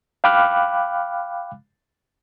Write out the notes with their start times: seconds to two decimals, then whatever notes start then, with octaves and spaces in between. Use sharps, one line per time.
0.24 F5 G5 B5 D6 F6 F#6